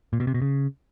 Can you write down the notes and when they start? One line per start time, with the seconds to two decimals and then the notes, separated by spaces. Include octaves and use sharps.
0.13 A#2
0.20 B2
0.27 C3
0.34 B2
0.42 C#3